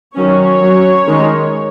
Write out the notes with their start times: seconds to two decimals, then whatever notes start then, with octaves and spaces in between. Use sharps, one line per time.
0.15 D#3 F#3 C#4 C#5
0.60 F#3 C#4
1.07 D#3 G#3 C#4